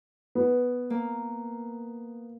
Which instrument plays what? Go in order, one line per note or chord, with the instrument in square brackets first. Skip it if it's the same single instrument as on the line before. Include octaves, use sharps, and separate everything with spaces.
[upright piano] B3
[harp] A#3